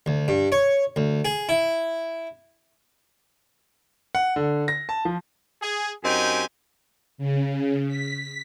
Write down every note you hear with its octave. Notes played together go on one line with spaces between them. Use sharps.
D2
G2
C#5
D2
G#4
E4
F#5
D3
A#6
A5
F3
G#4
F#2 C4 D#4 G4 G#5
C#3
B6